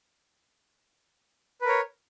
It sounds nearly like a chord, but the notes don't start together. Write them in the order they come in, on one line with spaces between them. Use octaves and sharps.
B4 A#4 C#5